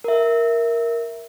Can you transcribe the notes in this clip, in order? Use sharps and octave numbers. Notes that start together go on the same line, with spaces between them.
A#4 E5